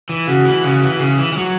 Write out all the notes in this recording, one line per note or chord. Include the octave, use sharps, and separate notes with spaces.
E3
C#3 F#4
E3
C#3 F#4
E3
C#3
E3
E3
F#3